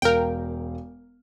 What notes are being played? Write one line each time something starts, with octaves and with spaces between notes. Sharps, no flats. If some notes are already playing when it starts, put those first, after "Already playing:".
E1 A#4 F5 G5